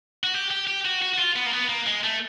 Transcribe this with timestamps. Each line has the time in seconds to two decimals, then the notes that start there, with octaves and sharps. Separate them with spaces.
0.24 F#4
0.34 G4
0.51 G4
0.67 G4
0.85 F#4
1.02 F#4
1.14 F#4
1.18 F4
1.36 B3
1.46 A#3
1.53 B3
1.69 A#3
1.87 G#3
2.04 A3